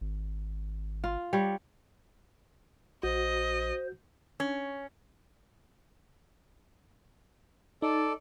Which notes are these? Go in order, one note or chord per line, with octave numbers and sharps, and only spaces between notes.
G#1
F4
G3 C#5
A#1 F#4 C5 D#5
C#4
D#4 A4 D5